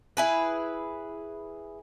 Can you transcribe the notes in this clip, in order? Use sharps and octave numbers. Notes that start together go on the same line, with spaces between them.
E4 G#4 B4